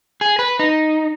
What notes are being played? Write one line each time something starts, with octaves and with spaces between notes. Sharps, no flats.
G#4
B4
D#4